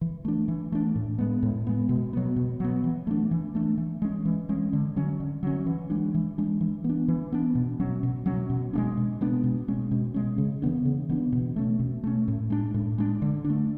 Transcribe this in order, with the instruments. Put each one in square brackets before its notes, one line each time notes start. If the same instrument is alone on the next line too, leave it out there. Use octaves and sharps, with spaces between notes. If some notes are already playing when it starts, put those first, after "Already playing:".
[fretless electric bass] E3
A3 D4
E3
A3 D4
A2
G#3 B3
A2
G#3 B3
B2
F#3 B3
B2
F#3 B3
E3
A3 D4
E3
A3 D4
E3
G#3 C#4
E3
G#3 C#4
D3
F#3 C#4
D3
F#3 C#4
E3
G#3 D4
E3
G#3 D4
E3
B3
D4
E3
B3 D4
B2
F#3 C#4
B2
F#3 C#4
B2
G#3 B3 D4
B2
G#3 B3 D4
B2
G#3 C#4
B2
G#3 C#4
C#3
E3 B3 D4
C#3
E3 B3 D4
B2
A3 C#4
B2
A3 C#4
A2
G#3 D4
A2
G#3 D4
D3
D4
A3